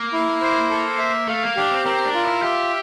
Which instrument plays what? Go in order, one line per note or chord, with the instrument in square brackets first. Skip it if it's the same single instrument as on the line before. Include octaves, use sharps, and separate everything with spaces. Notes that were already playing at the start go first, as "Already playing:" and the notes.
Already playing: [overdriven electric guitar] A#3
[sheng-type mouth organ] E4
C5
A4
E5
[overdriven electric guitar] A3 [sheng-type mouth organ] F5
[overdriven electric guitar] A#3
[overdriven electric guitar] D4 [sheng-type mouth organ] G4
[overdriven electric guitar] C4
[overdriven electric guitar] C4 [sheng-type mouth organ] A#4
[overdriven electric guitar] D4
[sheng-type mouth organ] F4
[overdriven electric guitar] E4
[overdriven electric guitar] G4 [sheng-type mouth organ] E5